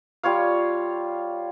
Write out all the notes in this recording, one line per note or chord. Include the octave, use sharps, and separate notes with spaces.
G3 F4 C#5 F5